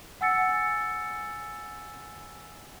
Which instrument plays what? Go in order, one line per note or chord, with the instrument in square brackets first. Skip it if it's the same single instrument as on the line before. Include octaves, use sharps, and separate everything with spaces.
[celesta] F#5 G#5 E6 A6 C#7